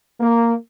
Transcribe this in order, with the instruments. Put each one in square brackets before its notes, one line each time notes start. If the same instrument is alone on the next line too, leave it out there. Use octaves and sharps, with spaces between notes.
[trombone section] A#3